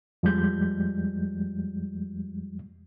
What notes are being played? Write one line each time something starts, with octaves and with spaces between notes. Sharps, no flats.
F2 F3 G3 G#3 G6